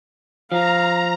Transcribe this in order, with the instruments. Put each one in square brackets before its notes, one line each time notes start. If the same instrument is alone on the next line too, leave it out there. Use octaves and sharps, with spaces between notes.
[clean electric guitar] F3 [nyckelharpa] F5 [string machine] A#5